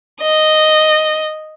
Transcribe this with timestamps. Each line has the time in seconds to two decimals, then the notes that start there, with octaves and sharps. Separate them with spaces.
0.22 D#5